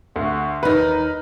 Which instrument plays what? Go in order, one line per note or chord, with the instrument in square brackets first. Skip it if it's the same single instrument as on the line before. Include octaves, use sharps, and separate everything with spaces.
[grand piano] D2 [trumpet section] F#4
[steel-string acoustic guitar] D#2 D#4 [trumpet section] A#4 [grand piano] B4